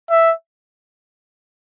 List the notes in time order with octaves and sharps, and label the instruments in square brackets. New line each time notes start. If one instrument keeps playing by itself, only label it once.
[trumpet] E5